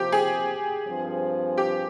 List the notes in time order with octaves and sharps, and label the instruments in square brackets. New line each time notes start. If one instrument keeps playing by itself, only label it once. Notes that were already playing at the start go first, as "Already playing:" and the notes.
Already playing: [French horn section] C3 F3 C4 [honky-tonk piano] G4
[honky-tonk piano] G#4
[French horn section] G2 F3 C4
[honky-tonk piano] G4